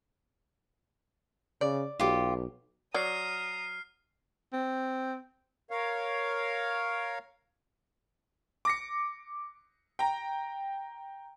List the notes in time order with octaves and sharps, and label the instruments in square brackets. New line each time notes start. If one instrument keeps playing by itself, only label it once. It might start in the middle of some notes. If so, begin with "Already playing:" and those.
[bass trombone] C#3 [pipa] D5
[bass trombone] B1 [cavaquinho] F4 G4
[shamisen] F#3 D5 [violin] A#5 D#6 [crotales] F6 C7
[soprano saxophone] C4
[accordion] A#4 C#5 F5
[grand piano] D6 A#6 C#7
G5 A#5